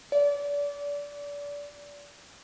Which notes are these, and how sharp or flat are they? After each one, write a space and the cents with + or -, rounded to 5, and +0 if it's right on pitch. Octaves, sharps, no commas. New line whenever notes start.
D5 -25